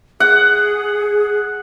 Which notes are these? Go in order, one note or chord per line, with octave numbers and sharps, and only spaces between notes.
G#4 F#5